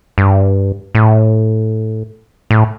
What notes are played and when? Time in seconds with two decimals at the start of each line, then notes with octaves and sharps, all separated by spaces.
0.18 G2
0.95 A2
2.51 A2